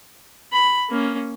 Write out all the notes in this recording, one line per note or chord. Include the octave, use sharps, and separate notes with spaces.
B5
A#3 C#4